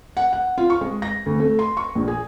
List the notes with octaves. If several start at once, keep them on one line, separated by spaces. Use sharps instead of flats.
F#5
F#5
F4
C#6
G#3
A#6
D2
A3
C6
C#6
A#1
G#4